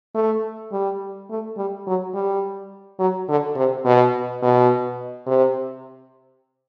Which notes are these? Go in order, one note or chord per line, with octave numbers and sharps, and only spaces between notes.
A3
G3
A3
G3
F#3
G3
F#3
D3
C3
B2
B2
C3